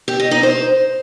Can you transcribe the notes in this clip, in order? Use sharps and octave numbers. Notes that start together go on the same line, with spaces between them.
G4
D#5
D#4
C5